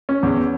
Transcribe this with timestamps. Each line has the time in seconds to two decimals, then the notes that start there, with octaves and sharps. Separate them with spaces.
0.09 C#4
0.23 E2